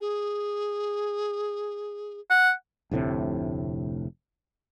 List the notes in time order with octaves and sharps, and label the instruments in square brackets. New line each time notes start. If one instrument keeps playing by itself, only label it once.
[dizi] G#4
[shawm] F#5
[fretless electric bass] F1 D2 A2 C3